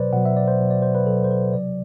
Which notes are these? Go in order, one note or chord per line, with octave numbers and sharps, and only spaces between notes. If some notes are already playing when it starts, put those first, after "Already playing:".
Already playing: B2 F#3 B4 C5 D5
B2 F#3 F#5
E5
D5
C5
B2 F#3
D5
C5
B4
B2 F#3 A4
C5
B4
C3 F#3 D5